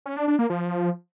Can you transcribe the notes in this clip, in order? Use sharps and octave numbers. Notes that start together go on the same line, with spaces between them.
C#4
D4
D4
A#3
F3